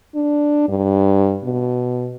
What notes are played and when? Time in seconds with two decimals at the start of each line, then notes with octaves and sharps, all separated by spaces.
0.15 D4
0.68 G2
1.44 B2